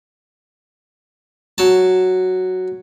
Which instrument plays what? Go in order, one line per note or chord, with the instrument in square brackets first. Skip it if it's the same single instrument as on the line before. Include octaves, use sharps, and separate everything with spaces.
[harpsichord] F#3 A5